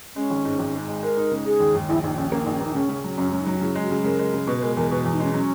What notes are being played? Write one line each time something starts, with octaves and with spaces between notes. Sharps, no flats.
G#3 C#4
G#1
G#2
G#1
G#3
G#3
G#3 A#4
D#4
C#3
D#4 G#4
D#2
D#2
A#1 E4
A#1 D#4
A#1 C#4
A#3 C#4
D#4
A#1
C#4
A#3 D#4
C#3 C#4
C#3
F#3
F#2 C#4
F#3 C#4
D#4
F#3
C#3 E4
G#3
F#4
C#3
C#3 A#4
G#3
C#3
B2 B4
B4
G#3 A#4
E2 A#4
B2 B4
E2
D#4
G#3 C#4
F#3 C#4